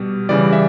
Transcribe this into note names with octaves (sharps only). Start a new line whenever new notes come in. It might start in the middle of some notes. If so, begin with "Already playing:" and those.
Already playing: B2 G3
C#3 E3 G3 D5
E5